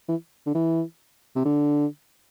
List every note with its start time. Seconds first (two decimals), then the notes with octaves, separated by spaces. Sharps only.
0.09 E3
0.46 D3
0.55 E3
1.36 C3
1.45 D3